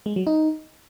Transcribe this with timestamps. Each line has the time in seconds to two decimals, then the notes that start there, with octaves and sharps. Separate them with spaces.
0.06 G#3
0.16 F#3
0.27 D#4